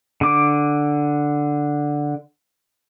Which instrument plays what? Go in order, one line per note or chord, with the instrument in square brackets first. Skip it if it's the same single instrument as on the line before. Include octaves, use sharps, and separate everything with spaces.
[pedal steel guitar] D3 D6